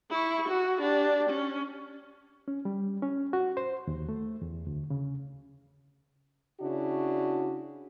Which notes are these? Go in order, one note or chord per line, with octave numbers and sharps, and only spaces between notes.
E4 C#6
F#4
D4 G4
C#4
C#4
G3
C#4
F#4
C5
D#2
A3
E2
D2
C#3
C#3 D4 E4 F#4